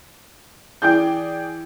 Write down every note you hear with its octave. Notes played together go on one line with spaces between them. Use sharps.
E3 G#4 D5 G5 G6